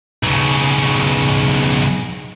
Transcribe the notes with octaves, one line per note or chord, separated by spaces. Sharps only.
B1 C#3